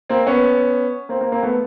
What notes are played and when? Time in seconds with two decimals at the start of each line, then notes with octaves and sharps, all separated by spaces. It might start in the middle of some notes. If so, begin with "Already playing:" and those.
0.09 A#3 C4
0.26 B3 C#4
1.09 A#3 C4
1.21 A#3 C4
1.32 A#3 C4
1.43 A3 B3